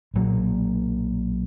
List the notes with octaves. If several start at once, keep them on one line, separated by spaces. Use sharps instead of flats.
B1 A#2 F#3 A#3